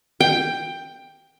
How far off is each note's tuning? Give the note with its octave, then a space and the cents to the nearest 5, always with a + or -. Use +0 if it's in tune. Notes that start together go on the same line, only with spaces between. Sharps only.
G5 +10